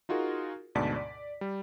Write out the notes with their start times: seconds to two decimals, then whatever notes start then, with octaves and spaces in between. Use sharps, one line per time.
0.09 D#4 F4 F#4 G#4 A#4
0.75 D2 G#2 B2 D5 A5 B6
0.96 D5
1.41 G3